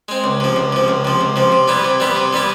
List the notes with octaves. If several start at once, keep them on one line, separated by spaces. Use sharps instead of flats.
G#3 C4
C#2
C3 F3
C#2
C3 F3
C#2
C3 F3
C#2
C3 F3
C3
E3 G3 B3 E4
C3
E3 G3 B3 E4
C3
E3 G3 B3 E4